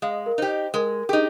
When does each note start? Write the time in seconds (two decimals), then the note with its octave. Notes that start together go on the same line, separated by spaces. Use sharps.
0.02 G#3 F5
0.26 A#4
0.38 D#4 G4 C5
0.74 G#3 A#4
1.09 D#4 G4 G#4